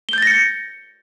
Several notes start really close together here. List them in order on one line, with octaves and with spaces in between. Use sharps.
G7 G6 A6 A#6 C#7